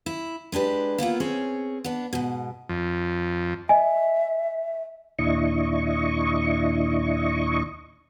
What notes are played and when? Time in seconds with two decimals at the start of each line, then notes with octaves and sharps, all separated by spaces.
0.06 E4
0.52 G#3 D4 G4 B4
0.98 A#3 B3 E4 F4
1.20 C4 C#4 G#4 C#5
1.84 B3 D4
2.13 G#2 B2
2.69 F2
3.69 D#5 E5 G#5
5.19 D#2 A#2 D4 E4 D#5 C#6